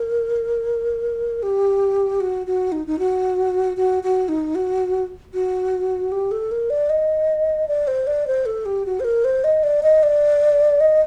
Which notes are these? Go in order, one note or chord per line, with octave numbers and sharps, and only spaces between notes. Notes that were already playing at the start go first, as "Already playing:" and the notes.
Already playing: A#4
G4
F#4
F#4
D#4
D#4
F#4
F#4
F#4
D#4
F#4
F#4
G4
A4
A#4
D5
D#5
D5
C5
D5
C5
A4
G4
F#4
C5
A#4
C5
D#5
D5
D#5
D5
D#5